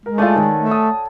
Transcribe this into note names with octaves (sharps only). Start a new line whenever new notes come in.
G#3 A#4
A3 F4 A4 D5 G#5
D#3 C#5 F#5
A3 F#5
A5 D#6